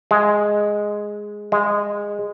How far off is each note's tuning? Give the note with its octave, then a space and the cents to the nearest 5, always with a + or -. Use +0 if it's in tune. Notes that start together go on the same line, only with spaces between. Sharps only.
G#3 +0
G#3 -15